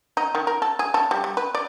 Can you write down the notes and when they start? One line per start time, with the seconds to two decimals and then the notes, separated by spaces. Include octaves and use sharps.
0.17 D#4
0.35 D#3
0.47 A#4
0.62 A4
0.79 G#4
0.94 A4
1.11 G3
1.24 G3
1.37 B4
1.55 D5